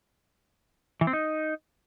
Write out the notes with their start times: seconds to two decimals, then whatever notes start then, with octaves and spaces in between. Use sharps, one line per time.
1.01 E3
1.07 C4
1.13 D#4